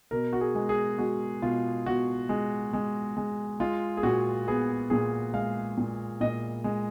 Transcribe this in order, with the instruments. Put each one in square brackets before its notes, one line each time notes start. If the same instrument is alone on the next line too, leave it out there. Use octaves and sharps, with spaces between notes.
[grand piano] B2 A#4
F#4
G#4
G#3
G#4
G#3 F#4
B2 F4
B2 F#4
G#3
G#3
G#3
G#3 F4
G#4
A#2 F#4
B3 G#4
A#2 G#4
G#3 F5
A#2
A#2 D#5
G#3